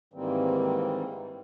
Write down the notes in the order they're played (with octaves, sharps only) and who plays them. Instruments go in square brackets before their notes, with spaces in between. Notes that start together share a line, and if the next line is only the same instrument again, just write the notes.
[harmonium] G#2 D#3 E3 G3 A#3 C4